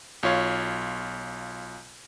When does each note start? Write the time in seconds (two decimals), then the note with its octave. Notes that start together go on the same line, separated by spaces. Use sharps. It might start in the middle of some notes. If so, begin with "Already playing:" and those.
0.23 B1 F4 C#5 F5